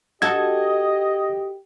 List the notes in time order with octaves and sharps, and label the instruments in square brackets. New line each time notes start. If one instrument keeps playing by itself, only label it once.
[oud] F#4 A4 [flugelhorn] G4 [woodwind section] D#5 [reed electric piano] G#6